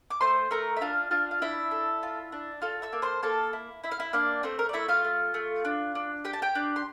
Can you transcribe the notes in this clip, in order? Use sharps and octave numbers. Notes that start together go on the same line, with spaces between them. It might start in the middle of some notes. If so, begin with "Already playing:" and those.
D6
A3 C5 C6
A3 A#4 A#5
E5
D4 F4 F5
D4 F4 F5
F5
D4 E4 E5
A4
F4
D4
F4 A4 F5
E5 E6
A#3
C5 C6
A#3 A4 A5
E4
E4 E5
F5
E4 E5
A#3 D4 D5
A3 C4 C5
A#4
D5
A3 E4 E5
F4 F5
A3
A3
D4
D4
G4 G5
A5
G4 G5
D4
C6